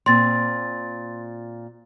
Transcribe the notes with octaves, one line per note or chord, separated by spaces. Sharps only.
A#2 C4 C6 A6